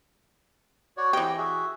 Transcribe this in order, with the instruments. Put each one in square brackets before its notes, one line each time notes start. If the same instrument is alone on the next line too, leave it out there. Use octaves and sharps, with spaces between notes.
[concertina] F#4 C#5 D5
[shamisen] E3 G4 [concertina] C4 D#5
[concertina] F#4 G#4 E5